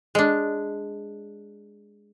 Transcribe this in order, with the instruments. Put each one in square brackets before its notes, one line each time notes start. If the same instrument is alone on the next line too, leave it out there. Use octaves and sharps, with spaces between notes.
[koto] G#3 D4